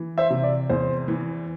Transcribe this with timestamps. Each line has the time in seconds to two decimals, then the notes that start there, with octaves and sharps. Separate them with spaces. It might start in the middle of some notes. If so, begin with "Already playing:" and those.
Already playing: E3
0.18 C5 E5
0.30 C3
0.43 D5
0.70 E2 C5
1.08 E3